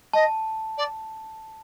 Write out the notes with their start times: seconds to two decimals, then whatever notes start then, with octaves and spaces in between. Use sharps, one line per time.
0.13 D#5 A5
0.77 D5